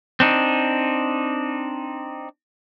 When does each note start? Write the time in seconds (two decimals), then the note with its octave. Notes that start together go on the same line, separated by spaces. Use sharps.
0.20 C4 D4 D#4